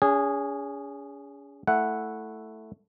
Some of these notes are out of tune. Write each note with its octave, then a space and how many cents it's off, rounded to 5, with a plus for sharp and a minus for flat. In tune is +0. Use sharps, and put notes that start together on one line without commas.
C#4 +40 G#4 -15
A3 +0 E4 +0 F#5 +0